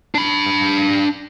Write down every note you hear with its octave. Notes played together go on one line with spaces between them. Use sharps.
D4 B5